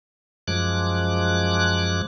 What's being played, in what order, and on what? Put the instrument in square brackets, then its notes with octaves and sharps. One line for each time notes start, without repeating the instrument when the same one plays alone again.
[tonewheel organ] F#2 F3 G#3 D6 F#6